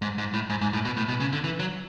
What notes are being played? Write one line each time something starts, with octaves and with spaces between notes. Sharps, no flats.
G#2
G#2
A2
G#2
G#2
A2
B2
A2
B2
C#3
D3
E3
F#3